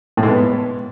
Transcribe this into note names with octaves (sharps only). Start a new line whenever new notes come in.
A2
G#2
B3